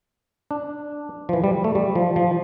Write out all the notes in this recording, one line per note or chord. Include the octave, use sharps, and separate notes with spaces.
D4
F3
E3
G3
A3
G3
F3
F3